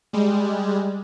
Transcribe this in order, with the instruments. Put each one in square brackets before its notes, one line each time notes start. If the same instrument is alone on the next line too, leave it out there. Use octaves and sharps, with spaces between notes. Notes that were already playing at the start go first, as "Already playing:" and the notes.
[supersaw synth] G3 G#3